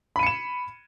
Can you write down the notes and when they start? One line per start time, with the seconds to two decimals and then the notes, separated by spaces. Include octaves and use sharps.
0.16 B5
0.19 D#7
0.23 C#7
0.26 E7